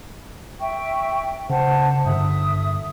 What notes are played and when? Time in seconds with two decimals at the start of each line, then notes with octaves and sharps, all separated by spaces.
0.61 E5 G5 C#6
1.50 C#3 C5 F#5 A5
2.06 G2 D3 E5 D#6